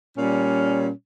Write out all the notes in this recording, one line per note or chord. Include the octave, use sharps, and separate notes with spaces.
A#2 G3 C#4